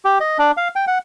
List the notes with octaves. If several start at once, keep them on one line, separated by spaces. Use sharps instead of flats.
G4
D#5
D4
F5
G5
F#5